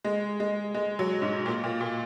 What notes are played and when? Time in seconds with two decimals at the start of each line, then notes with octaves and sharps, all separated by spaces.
0.05 G#3
0.40 G#3
0.74 G#3
0.99 F#3
1.22 G#2
1.46 A#2
1.63 A#2
1.81 A#2